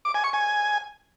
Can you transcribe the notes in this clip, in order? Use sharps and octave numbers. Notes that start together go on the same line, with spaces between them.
D6
G#5
C#6
G#5